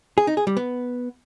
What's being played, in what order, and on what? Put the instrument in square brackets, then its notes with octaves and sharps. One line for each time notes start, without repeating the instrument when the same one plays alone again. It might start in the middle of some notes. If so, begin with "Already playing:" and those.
[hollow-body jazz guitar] G#4
D#4
G#4
G3
B3